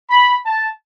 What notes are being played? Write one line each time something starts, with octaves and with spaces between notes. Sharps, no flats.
B5
A5